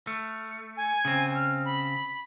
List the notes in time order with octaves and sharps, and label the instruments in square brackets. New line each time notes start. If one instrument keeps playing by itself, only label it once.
[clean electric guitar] A3 [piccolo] F6
[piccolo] G#5
[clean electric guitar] C#3 C4
[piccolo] F6
B5